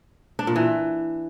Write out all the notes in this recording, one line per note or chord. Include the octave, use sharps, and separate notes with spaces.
D4
A#2
E3